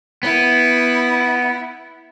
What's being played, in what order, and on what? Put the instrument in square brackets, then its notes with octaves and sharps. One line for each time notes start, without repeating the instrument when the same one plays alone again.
[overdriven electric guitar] B3 [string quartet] E4